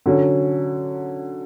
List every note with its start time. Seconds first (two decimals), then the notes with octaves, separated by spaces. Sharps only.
0.06 D3 F#3 C#4